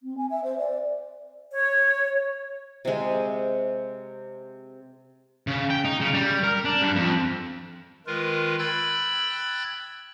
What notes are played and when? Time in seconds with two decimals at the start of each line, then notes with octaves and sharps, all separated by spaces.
0.02 C4
0.17 G#5
0.30 E5
0.44 C5
0.58 D5
1.52 C#5
2.85 C3 G#3
5.47 C#3
5.70 G5
5.85 D#4
6.00 C#3
6.14 G3
6.43 A#4
6.65 D4
6.82 G2
6.96 F2
8.07 D#3 G#3 F4 A#4 B4
8.59 G5 B5 E6 F#6 G#6 A6